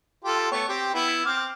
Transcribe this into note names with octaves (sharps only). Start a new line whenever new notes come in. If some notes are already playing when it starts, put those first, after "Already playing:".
F4 G4 A4
A3 B3 C#5
C4 G4
B3 E4
C4 D6 F6